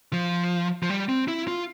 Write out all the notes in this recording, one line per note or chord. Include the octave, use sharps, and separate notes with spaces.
F3
F3
G3
C4
E4
F4